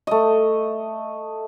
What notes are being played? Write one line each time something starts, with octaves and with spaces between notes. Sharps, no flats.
A3 D#5